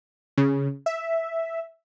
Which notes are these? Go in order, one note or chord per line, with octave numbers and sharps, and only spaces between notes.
C#3
E5